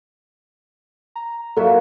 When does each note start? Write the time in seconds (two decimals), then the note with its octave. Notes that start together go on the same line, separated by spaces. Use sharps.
1.16 A#5
1.56 A#2 F#3 F#4 A4 E5